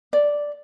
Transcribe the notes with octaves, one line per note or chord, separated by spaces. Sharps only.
D5